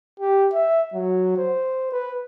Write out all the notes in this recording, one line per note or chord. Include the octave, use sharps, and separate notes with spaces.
G4
E5
F#3
C5
B4